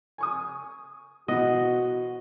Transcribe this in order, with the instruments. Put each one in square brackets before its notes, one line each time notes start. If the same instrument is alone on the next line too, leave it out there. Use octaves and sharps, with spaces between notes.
[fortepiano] G#5 C#6 D#6
[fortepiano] B2 E3 [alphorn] F#4 [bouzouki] C5 F#5 [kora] D#5